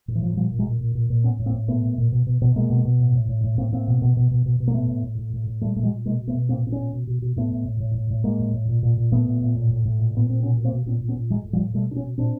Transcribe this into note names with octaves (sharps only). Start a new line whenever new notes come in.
A2
E3
A2 F3
F#3
A#2 F3 G3
A#2
F#3 G#3
A#2
A#2
A#2
A#2
A2 B3 C#4
A2
A#3 C4
A2
A#2 A3 B3
A#2
A#2
B2
B2
B2
B2 G#3 A#3
B2
B2
A2
A2
A2
A2
A2 A#3 C4
A2 A#3 C4
B2
B2
B2
B2
B2
B2
A#3
A2 A3 B3
A2
A2
A2
A2
A2
A#2 G3 A3
A#2 A3
F#3 G#3
A#2
B2 G#3 A#3
B2
A3 B3
B2
A#2 A#3 C4
A#2 C4
B3 C#4
A#2
B2
B2
B2
A2 A3 B3
A2
A2
A2
A2
A2
A2 G#3 A#3
A2
A2
A#2
A#2
A#2
A#2 A3 B3
A#2
A#2
A2
A2
A2
A#2
A#2 B3
A#2 C4
B2 B3 C#4
B2
A#3 C4
B2
A#2 B3 C#4
A#2
B3 C#4
A#2
A2 F#3 G#3
A2
F3 G3
A2
B2 G3 A3
B2 D4
B3 C#4
B2
A#2 C4 D4